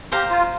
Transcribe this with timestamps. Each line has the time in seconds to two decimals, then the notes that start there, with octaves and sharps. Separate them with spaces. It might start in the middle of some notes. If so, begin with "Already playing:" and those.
0.12 G4 C5 F5 A#5
0.30 F4